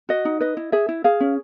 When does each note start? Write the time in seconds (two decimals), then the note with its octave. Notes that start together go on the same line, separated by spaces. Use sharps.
0.09 F#4 D#5
0.25 D#4
0.40 B4 D#5
0.57 E4
0.72 G#4 E5
0.89 E4
1.04 G#4 F5
1.20 C#4